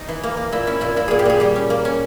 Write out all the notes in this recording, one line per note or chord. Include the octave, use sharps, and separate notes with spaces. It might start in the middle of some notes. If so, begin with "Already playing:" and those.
Already playing: D#4
E3
A#3
A#3
A#2 E4
C#4 E4
A#2 E4
A#2 E4
A#2 G#4
G4
A#2 G#4
G3 G4
C#4
A#3
C#4